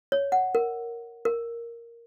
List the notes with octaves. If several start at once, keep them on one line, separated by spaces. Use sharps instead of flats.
C#5
F#5
A#4
A#4